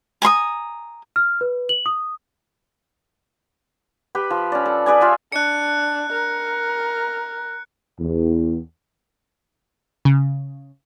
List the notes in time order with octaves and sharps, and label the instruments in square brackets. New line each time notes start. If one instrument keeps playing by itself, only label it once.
[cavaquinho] G#5 A#5 C6 D#6
[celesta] F6
B4
F#7
D#6
[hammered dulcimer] G4 B4
F3
C#4 D5
A4
G#4 B4 D5 G#5
F4 B4 E5 F5
[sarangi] D4 [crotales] F#6 C#7
[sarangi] A#4
[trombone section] E2
[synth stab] C#3